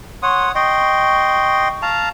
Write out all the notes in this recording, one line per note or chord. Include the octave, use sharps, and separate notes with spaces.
C#5 F#5 C6 D#6
D#5 G5 C6 C#6
F5 A5 A#5